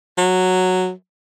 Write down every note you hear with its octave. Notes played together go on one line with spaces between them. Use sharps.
F#3